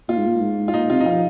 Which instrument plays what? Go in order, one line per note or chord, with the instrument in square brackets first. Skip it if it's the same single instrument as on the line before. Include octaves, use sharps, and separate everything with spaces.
[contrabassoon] A#2 [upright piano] F4
[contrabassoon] G#2
A#2
G#2
[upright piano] F4
[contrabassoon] A#2 [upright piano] D#4
[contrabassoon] C3 [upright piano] F4
[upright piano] D#4
[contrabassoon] F3 [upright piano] F4